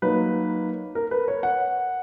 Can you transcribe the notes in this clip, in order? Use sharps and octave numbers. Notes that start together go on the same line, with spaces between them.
F#3 A#3 D#4 B4
A#4
B4
C#5
F#5